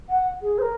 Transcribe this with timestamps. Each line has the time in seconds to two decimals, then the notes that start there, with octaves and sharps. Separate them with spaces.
0.09 F#5
0.42 G#4
0.58 C5
0.62 A#4